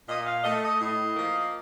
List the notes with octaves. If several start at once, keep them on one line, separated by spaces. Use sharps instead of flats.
A#2 D#5
F5
A3 D#5
D#5
A2 D#5
F3 A#3